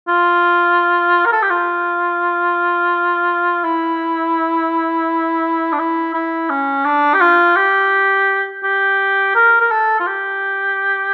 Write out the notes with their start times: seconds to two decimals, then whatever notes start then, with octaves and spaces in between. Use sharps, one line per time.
0.08 F4
1.25 A#4
1.33 A4
1.42 G4
1.51 F4
3.64 E4
5.73 D4
5.79 E4
6.14 E4
6.50 C#4
6.85 D4
7.14 G4
7.21 F4
7.56 G4
8.64 G4
9.36 A#4
9.61 A#4
9.71 A4
10.00 F4
10.07 G4